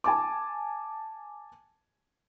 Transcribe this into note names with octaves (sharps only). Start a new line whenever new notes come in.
G#5 A5 D6